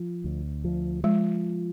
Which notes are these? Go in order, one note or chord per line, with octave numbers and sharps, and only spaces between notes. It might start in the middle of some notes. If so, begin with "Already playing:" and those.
Already playing: F3
D2
F3
F3 G#3